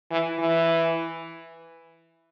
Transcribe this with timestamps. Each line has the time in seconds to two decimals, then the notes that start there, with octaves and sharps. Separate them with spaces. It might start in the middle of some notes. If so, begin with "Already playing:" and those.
0.11 E3
0.39 E3